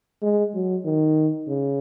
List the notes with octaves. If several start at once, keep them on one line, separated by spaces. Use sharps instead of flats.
G#3
F#3
D#3
C#3